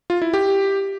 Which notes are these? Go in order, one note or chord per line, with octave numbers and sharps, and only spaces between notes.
F4
E4
G4